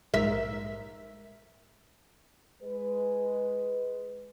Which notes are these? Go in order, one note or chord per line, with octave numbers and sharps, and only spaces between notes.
A#1 G#2 A#4 E5
G#3 B4